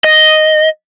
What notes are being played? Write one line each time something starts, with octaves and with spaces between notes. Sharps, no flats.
D#5